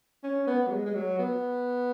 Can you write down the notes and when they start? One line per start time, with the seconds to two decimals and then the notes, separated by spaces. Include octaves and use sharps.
0.24 C#4
0.47 B3
0.67 F#3
0.71 G#3
0.86 G#3
0.95 F#3
1.19 B3